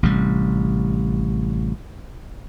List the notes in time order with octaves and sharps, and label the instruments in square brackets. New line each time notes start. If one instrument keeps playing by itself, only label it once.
[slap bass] A1 C3 G3